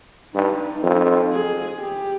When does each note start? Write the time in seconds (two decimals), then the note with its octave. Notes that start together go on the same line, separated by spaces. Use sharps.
0.34 G2 D#4
0.83 F2
1.32 G#4
1.80 G4